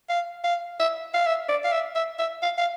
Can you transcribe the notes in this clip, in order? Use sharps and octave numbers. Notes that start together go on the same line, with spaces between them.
F5
F5
E5
F5
E5
D5
F5
E5
E5
E5
F5
F5